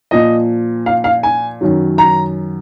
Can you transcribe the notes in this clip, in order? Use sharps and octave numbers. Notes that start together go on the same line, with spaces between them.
A#2 F3 D#5
F5
F5
G#5
F#2 D#3 F#3
A#5